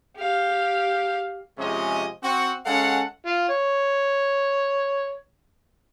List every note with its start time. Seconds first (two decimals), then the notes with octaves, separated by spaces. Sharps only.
0.17 G4 F5
1.58 C3 F3 G#3 C#4 G#4 D#5
2.22 C4 F#4
2.66 G#3 C#4 A4 F5 F#5
3.26 F4
3.49 C#5